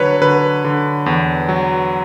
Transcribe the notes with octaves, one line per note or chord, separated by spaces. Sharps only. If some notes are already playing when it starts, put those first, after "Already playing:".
Already playing: D3 F#3 B4 C#5
D3 B4
D3
E2
F#3